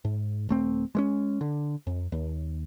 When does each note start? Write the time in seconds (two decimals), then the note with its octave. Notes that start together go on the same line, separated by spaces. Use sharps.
0.05 G#2
0.49 D#1 A3 C4
0.95 G#3 A3 C#4
1.41 D3
1.87 F2
2.12 D#2